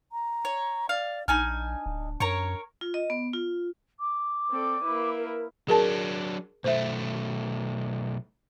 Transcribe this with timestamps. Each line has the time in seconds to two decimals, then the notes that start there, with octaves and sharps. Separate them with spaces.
0.12 A#5
0.45 C#5
0.89 D5 F5
1.28 A#1 D4 D#4 G#5 F6
1.86 D1
2.20 F#2 A#4 C#5 C#6
2.81 F4
2.94 D#5
3.10 B3
3.33 F4
3.99 D6
4.50 C4 A4 D5
4.82 A#3 E4 B4
5.17 A#4
5.68 F#3 D4 G#4 A#4 A5
6.64 B1 A3 C5 E5